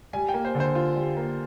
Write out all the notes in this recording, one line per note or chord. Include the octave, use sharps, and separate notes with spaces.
G3 G#5
G5
A#3
C5
D3
C5
F4
G3
A#3